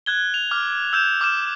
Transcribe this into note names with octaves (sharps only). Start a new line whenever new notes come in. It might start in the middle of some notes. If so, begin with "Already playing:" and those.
F#6 G#6 G7
F7
D6 F6
E6 G6 E7
D6 F6 E7